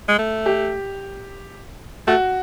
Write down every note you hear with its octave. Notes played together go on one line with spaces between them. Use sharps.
G#3
A3
G4
A3 F#4